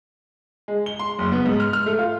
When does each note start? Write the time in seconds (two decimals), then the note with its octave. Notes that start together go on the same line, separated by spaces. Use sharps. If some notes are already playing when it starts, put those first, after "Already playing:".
0.68 G#3
0.86 G7
0.99 C6
1.19 F#1
1.32 B3
1.46 G#2
1.60 F6
1.73 F6
1.86 A3
1.99 F4